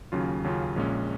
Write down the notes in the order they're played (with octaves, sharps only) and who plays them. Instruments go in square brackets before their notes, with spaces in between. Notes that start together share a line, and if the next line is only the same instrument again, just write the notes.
[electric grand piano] D#2 C#3 F#3 C#4 F4
D#2 C#3 F#3 C#4 F4
A#1 A#2 G#3 C#4